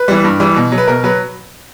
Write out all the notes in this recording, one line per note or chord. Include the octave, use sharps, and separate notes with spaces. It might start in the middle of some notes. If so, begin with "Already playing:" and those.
Already playing: B4
E3 G3
G2
E3 G3
B2
F#3
B4
B2 A#4
F#3 B4